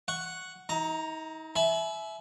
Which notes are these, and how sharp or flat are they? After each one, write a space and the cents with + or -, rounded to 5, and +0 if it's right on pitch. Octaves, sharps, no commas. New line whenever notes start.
F#5 +0 C#6 +0
D#4 +40 A#5 +0
E5 +0 G#5 +40 B5 +0